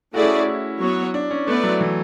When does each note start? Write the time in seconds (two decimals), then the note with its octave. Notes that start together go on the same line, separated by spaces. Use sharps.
0.14 A3 E4 F#4 G#4 D5
0.22 C#4
0.47 E4
0.80 F#3 B3 F#4 C#5
1.14 D4
1.31 C#4
1.47 A3 B3 E4 B4 D5
1.63 F#3
1.81 E3